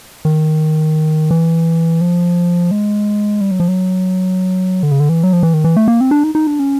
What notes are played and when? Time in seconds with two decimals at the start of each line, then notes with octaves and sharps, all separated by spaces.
0.25 D#3
1.31 E3
2.01 F3
2.71 G#3
3.41 G3
3.51 F#3
3.60 F3
3.68 F#3
4.83 D3
4.91 C#3
5.00 D3
5.09 E3
5.24 F#3
5.33 F3
5.43 E3
5.54 D#3
5.64 E3
5.77 A3
5.88 A#3
6.01 C4
6.11 D4
6.24 D#4
6.35 D#4
6.47 D4
6.59 C#4